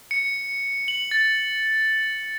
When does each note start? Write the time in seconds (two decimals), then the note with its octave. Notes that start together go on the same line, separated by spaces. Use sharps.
0.11 C#7
0.88 F#7
1.11 A6